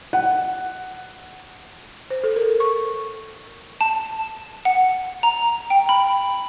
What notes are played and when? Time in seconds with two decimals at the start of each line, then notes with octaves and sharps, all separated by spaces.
0.13 F#5
2.11 C5
2.24 A4
2.36 A#4
2.60 C#6
3.81 A5
4.65 F#5
5.23 A#5
5.70 G5
5.89 B5